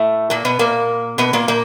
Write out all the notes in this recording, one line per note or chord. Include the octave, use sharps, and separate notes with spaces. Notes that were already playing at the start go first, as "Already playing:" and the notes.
Already playing: A2 A3
A#2 A#3
B2 B3
A#2 A#3
B2 B3
A#2 A#3
A#2 A#3